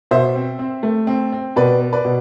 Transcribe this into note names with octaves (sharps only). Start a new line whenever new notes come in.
B2 C5 E5
C4
C4
A3
C4
C4
B2 B4 D5
B3
B4 D5
B2